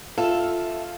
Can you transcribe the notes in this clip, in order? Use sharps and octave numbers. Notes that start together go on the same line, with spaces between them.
F4 A4 E5 F5